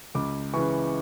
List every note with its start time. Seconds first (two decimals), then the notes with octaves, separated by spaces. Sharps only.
0.15 C#2 D6
0.53 C#3 E3 C#6